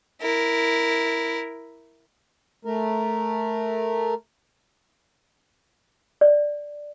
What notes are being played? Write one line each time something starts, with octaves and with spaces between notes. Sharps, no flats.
E4 A#4
A3 A#4
D5